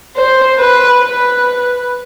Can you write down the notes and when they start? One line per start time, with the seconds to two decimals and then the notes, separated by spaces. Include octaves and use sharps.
0.16 C5
0.58 B4
1.02 B4